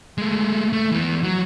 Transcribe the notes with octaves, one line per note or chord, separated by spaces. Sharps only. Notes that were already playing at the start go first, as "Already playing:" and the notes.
G#3 A3
A3
E3 B3
F#3